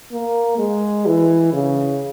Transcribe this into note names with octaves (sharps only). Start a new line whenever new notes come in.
A#3
G#3
E3
C#3